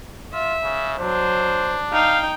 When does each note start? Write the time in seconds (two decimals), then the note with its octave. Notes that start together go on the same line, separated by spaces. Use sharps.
0.33 F4 E5
0.63 C#3
0.99 F#3 D4 C5
1.93 D#4 F5 G5